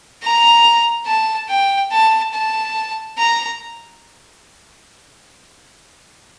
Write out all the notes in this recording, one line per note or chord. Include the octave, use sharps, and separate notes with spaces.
A#5
A5
G5
A5
A5
A#5